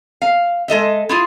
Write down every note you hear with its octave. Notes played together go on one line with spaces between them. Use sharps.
F5
G#3 A4 D#5 E5
E4 F4 G#4